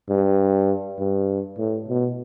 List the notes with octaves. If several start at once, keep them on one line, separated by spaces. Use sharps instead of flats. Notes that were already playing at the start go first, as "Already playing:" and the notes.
G2
G2
A2
B2